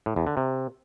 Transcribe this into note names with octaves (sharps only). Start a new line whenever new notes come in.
A2
E2
D3
C3